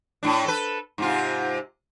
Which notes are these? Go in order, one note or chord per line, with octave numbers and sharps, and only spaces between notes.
A2 D4
A4 B4
G#2 C3 F4